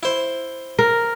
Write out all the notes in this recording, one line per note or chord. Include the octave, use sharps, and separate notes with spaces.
E4 C5
A#4